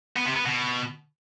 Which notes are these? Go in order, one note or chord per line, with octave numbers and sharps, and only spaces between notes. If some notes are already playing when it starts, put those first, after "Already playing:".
B3
C3
B3
B2